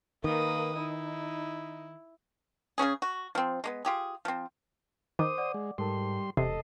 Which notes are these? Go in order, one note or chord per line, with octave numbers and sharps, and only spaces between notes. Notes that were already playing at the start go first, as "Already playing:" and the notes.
D#3 A#3 B4 D#6
D#4 E4
C#3 F#3 C#4 G#4
F#4
F3 C4
G#3 A#3 B3
F4 G4 G#4
F3 C4
D#3 C5 D6 D#6
D5 F#5 D6
G#3
G#2 G3 A4 A#4 A5 C6
E1 C3 A4 D#5 C7